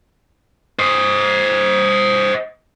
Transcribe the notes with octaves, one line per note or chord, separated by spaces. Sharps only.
C5 D#5